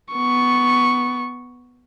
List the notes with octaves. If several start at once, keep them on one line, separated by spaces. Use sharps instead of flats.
B3 C#6